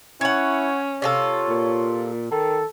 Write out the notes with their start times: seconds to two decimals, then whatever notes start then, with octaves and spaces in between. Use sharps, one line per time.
0.21 C#4 E4 C#5 F#5
1.02 C3 F4 A4 C#5
1.49 A#2
2.31 D#3 A4